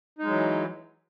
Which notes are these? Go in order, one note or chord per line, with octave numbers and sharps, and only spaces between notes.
E3 F#3 G#3 D#4